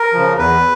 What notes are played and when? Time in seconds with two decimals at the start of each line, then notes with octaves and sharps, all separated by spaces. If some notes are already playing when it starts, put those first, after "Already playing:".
Already playing: A#4
0.13 C#3 F3
0.38 E2 B4